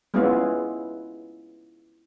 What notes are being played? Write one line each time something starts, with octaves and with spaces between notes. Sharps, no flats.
G#3 B3 C#4 E4 F4 G#4